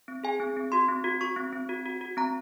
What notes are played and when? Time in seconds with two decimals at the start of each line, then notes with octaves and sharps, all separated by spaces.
0.08 C4
0.24 G#4 G#5
0.40 C4
0.57 C4
0.72 F#4 C6
0.88 C4
1.04 F#4
1.21 F#4 C#6
1.36 C4
1.53 C4
1.69 F#4
1.85 F#4
2.01 F#4
2.17 C4 A#5